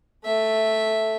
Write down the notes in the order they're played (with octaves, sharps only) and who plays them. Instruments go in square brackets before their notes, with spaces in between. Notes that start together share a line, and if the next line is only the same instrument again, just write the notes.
[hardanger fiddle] A3 E5